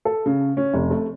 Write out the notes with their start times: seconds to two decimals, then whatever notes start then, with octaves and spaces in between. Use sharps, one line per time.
0.05 A4
0.26 C#3
0.57 C#4
0.73 F1
0.91 A3